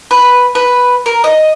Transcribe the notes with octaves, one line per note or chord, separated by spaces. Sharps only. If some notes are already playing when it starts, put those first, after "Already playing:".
B4
B4
A#4
D#5